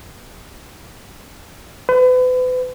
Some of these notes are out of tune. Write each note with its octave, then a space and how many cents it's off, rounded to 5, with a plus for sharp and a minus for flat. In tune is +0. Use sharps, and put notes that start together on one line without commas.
B4 +40